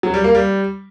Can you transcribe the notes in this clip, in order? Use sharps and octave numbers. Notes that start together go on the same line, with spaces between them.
F#3
G3
A#3
G3